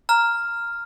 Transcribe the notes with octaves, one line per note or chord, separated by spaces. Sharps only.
A#5 F6